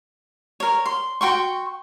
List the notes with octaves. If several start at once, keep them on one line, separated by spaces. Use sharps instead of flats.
A#4 C#5
C6
F#4 G5 C6 C#6